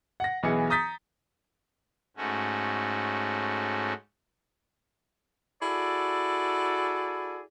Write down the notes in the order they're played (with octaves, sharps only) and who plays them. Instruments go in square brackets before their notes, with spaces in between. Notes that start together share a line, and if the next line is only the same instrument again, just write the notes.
[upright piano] F#5 A#6
B1 E3 B3 G#4 C#7
A#5 D#6 G6 A6 B6
[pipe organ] G#2 A3 C#4 F#4
[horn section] E4 F#4 G#4 A4 D5